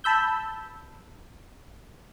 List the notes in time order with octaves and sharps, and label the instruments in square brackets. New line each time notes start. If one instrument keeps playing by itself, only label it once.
[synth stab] A5 B5 E6 G6